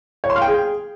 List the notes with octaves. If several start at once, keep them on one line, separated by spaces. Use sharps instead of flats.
C#5
C6
F5
G5
G#4